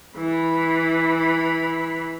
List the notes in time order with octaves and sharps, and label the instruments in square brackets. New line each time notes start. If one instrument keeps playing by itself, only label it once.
[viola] E3 B5